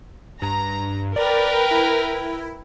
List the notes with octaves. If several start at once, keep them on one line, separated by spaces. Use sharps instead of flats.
G2 A#5
A#4 B4 D5 G5
E4